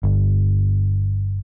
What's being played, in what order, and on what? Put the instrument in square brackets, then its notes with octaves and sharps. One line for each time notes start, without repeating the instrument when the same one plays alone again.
[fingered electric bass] G1